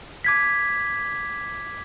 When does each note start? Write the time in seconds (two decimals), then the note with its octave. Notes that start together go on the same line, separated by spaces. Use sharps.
0.24 D6 G#6 B6